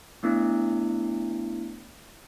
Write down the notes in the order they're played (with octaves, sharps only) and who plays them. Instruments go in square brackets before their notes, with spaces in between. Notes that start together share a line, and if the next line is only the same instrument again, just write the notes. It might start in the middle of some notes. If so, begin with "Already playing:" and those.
[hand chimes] A3 B3 D4 E4